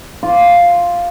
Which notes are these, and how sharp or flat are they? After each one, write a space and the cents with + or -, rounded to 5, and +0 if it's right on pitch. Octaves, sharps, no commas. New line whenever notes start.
F4 +0 D6 -10